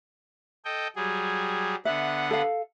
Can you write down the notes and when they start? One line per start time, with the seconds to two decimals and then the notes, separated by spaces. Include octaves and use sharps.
0.65 A4 D#5 G5
0.96 F#3 G3 G#4
1.85 D3 B3 E5 F#5
2.31 A4 F5